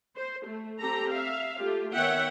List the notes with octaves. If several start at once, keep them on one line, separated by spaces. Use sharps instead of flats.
C5
A3
C4 G4 A4 A#5
E5 F5
A3 F4 G4
D#3 B3 C#5 E5 F#5 G5